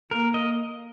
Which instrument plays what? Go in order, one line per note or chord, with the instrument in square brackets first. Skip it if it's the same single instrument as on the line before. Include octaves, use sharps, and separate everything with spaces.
[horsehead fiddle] A#3 [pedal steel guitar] A#4
[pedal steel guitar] D#5